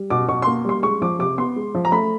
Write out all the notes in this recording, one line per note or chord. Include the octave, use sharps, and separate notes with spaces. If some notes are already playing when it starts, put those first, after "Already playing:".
Already playing: G3
B2 D6
B2 C#6
C6
A#3
G3 C6
G#3 C#6
F3 D6
C3 D6
B3 C6
G#3
F3
A#5
A3 B5